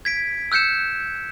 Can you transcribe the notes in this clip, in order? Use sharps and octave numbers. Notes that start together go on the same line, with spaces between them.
G#6 B6 D7
E6 F#6 G6 C#7 E7